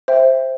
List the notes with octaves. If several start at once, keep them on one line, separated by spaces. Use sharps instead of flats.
C5 E5 G5